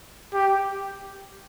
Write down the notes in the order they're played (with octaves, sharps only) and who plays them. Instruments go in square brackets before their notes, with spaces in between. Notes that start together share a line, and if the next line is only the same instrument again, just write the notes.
[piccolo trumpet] G4